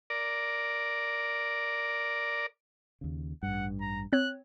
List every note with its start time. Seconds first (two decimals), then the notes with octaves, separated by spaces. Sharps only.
0.10 A#4 D5
3.01 D#2 C#3
3.43 A1 G2 F#5
3.81 A#5
4.13 C4 C#5 F#6